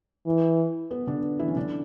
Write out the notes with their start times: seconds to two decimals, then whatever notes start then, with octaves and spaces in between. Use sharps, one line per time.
0.26 E3
0.91 B3 B4
1.07 D3 D4
1.39 E3 E4
1.48 C#4
1.56 D3 D4